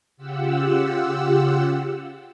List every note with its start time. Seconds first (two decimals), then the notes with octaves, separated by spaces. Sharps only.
0.17 C#3 F4 G4 F#5 E6